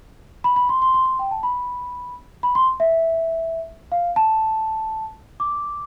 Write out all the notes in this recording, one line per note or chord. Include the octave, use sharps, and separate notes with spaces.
B5
B5
C6
C6
C6
C6
G5
A5
B5
B5
C6
E5
F5
A5
D6